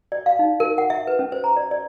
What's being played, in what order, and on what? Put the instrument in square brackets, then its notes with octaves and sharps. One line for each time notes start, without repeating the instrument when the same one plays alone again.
[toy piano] D5
F5
D#4
A#4
F#5
E5
B4
C#4
C5
A#5
D5
D5